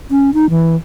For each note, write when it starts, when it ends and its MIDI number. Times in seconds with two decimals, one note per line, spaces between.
0.11 0.30 61
0.34 0.49 63
0.50 0.76 52